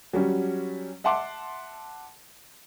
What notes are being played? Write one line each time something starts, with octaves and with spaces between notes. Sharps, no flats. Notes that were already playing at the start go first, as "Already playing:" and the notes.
F#3 G3 C#4
E5 F#5 A5 C6 D6